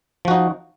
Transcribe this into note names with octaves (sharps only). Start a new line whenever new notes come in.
F3 D#4 F#4